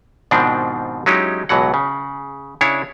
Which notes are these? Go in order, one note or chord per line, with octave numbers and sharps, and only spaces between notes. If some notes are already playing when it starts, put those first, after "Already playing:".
G#2 B2 D#3 F3 C4 D4
F#3 G#3 C#4 D#4 E4 G4
C#2 B2 E3 F#3 F#5
C#3
C#3 D4 E4 C#5